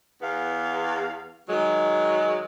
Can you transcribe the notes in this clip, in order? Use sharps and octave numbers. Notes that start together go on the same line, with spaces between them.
E2 B3 F5
D#3 F#3 G#3